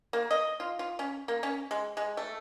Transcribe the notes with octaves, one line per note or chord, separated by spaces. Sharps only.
A#3
D#5
F4
F4
C#4
A#3
C#4
G#3
G#3
A3